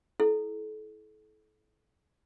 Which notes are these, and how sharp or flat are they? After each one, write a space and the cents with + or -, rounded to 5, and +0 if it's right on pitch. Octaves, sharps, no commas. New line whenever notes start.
E4 -10 A4 -35